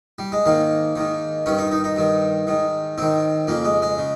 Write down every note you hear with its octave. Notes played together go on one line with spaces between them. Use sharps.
G3
G#3
G#2 D#3 A#3
G#2 D#3
G2 D#3 C#4
D#4
D#4
D#4
G2 D#3
G#2 D#3
G#2 D#3 C4
F2 C#3 A#3
G#3
G#3
C#3